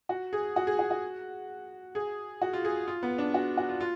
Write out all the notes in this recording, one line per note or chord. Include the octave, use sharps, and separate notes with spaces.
F#4
G#4
F#4
G#4
F#4
F#4
G#4
F#4
F4
G#4
F4
B3
D4
F#4
F#4
F4
F4